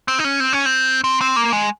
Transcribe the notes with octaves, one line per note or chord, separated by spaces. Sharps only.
C4
D#4
C#4
C4
C#4
C4
C4
C4
A#3
G#3